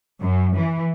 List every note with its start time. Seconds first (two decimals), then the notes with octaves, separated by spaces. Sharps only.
0.22 F#2
0.58 E3